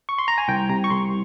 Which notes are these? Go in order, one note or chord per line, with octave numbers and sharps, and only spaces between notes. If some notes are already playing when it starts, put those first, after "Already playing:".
C#6
C6
A#5
G#5
C2 G5
C3 A#5
C#6
C2 C6